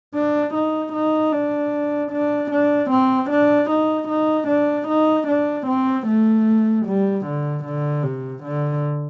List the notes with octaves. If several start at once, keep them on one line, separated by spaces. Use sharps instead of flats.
D4
D#4
D#4
D4
D4
D4
C4
D4
D#4
D#4
D4
D#4
D4
C4
A3
G3
D3
D3
C3
D3